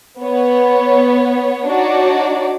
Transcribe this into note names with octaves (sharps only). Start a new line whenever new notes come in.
B3 C#5
D4 D#4 F#4 C#5 D5